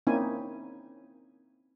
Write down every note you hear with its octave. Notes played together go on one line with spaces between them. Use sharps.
A#3 C4 C#4 D#4 E4 G#5